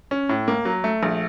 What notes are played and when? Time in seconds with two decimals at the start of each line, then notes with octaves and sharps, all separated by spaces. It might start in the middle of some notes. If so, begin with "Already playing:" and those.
0.11 C#4
0.29 A2
0.48 A#3
0.65 F#3
0.84 A3
1.03 A#1